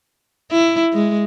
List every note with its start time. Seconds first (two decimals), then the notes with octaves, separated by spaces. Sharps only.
0.52 E4
0.93 G#3